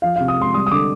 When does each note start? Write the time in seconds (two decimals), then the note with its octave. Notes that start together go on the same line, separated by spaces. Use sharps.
0.02 F3 F5
0.16 C3 F5
0.28 D#6
0.37 G#3 C6
0.54 G3 D#6
0.66 D#6
0.71 D3 D6